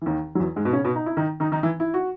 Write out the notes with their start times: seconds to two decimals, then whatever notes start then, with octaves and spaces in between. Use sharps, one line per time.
0.02 E3
0.06 D#2 D#3
0.35 F#3
0.40 E2 E3
0.56 G#2 G#3
0.65 B2 B3
0.73 C#3 C#4
0.85 B2 B3
0.95 D#4
1.06 E4
1.17 D#3 D#4
1.40 D#3 D#4
1.52 D#3 D#4
1.63 E3 E4
1.80 E4
1.94 F#4